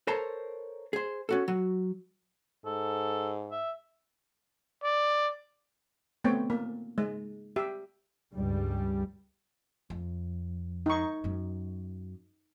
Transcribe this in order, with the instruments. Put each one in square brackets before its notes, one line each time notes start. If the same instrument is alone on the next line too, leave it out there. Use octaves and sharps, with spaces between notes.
[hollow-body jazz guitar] A4 A#4 C5 C#5 A5 A#5
G#4 C5
C#4 F#4 A4
F#3 F#4
[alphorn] G#2 [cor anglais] A4
[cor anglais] E5
[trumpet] D5
[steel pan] A3 B3 C4 C#5 G5
A#3
G#3
G4 E5
[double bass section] C#2 G2 G3
[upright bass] F2
[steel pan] D#4 C#6
[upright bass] F#2 F#3